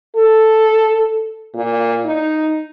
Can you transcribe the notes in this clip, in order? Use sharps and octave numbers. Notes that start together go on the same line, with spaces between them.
A4
A#2
D#4